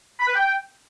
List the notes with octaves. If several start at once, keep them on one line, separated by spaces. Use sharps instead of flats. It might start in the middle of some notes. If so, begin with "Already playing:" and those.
B5
B4
G5